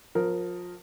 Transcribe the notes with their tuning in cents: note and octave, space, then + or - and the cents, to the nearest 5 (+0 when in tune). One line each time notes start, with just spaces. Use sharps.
F3 +25 A#4 +0